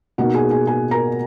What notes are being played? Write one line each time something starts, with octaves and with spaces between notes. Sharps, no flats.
B2 A#3 D#4 F#4 F#5
G#4 G#5
G#4 G#5
G#4 G#5
A#4 A#5